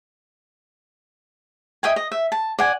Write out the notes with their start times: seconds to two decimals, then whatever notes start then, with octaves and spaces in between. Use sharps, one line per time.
1.83 D#5 E5 G5 G#5
1.96 D#5
2.11 E5
2.32 A5
2.59 D5 F#5 G#5